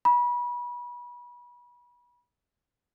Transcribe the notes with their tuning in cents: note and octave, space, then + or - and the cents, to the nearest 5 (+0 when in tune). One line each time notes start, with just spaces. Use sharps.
B5 -30